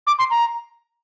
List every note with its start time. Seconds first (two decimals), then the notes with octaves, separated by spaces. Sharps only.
0.07 D6
0.19 C6
0.30 A#5